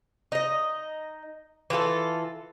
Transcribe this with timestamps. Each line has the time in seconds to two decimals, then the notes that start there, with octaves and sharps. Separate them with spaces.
0.32 D#4 D#5
1.70 E3 F4 G4 A4